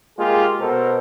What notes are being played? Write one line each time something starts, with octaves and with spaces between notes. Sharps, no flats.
G#3 A#3 F4 G4 G#4
B2 A4 A#4 C5